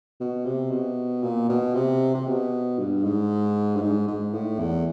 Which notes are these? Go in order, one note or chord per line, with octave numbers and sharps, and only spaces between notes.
B2
C3
B2
A#2
B2
C3
C3
B2
G2
G#2
G2
G#2
G#2
A2
E2